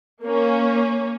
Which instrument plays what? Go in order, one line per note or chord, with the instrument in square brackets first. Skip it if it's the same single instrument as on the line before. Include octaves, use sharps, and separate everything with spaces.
[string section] A#3 C#4